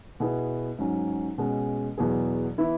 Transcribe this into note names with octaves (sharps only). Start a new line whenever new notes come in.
B2 B3 E4 G#4 B4
G#2 F#3 C#4
B2 G#3 C#4
E2 B2 F#3 B3 G#4
E3 B3 E4